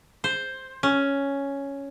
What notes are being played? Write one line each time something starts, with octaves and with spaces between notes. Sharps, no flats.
C5
C#4